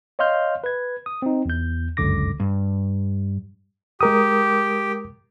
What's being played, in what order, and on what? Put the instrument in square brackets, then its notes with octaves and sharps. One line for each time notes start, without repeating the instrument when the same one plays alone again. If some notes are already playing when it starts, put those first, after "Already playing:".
[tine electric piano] C#5 D#5 F5 C6 F6 G6
B4 G#6
D#6
C4 D#4
E2 G6
G1 C#2 F#2 D3 D6 A#6
[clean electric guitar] G2
[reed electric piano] G#3 A#4 D#6 [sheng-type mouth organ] G4